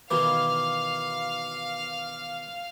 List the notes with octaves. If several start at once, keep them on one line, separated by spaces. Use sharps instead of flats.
B2 D#3 E3 F5 D6